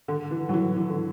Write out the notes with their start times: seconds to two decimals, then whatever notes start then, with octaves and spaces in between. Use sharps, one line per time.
0.08 D3
0.31 E3
0.49 F#3
0.53 E3
0.76 E3
0.90 D3